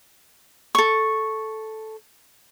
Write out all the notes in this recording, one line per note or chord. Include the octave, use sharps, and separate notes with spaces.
A4 C#6